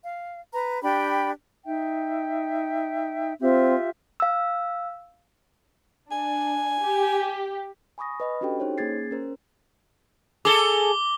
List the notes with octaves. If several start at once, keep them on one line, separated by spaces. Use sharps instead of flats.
F5
B4 A#5
D4 G4 G5 B5
D#4 E5 G5
C4 F4 G4 E5
F5 E6
D4 G#5
G4
G#5 B5 C#6 D#6 A#6
B4 D#5 B5
C#4 D4 F#4 G4 A4 G5
D#4 C5 C#5
A#3 C#4 G#4 G#6 A6 C7
C#4 A#4 C5
G#4 A4 D6 G7